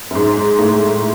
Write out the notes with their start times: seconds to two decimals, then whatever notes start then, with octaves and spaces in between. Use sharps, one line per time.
0.11 F#2
0.15 G#2
0.59 A2